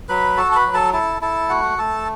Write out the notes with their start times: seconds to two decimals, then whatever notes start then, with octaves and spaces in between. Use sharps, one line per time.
0.09 F#3 B4 B5
0.37 F#4 A4 A5
0.52 A5
0.56 B4 B5
0.66 F#3
0.74 A4 A5
0.93 E4 A4 A5
1.21 E4 A4 A5
1.50 A3 F#4 F#5
1.78 A3 A4 A5